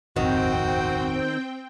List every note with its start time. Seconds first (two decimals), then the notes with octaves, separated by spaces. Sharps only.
0.16 D#1 G#1 F2 D#3 C4 F#4 G5